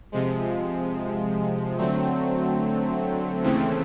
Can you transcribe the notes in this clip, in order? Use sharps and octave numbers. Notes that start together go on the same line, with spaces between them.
C3 F3 G#3
D3 F#3 A3 C4
D#2 C#3 E3 A3 C4